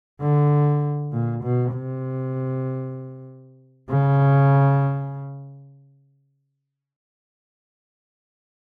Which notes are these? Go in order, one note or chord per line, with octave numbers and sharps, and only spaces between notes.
D3
A#2
B2
C3
C#3